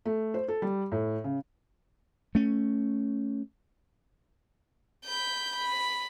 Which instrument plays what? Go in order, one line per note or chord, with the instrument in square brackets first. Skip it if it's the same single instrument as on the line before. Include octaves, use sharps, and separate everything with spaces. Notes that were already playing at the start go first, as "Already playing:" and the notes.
[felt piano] A3
C5
A4
G3
A2
C#3
[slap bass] A3 C#4
[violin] B5 G6
B5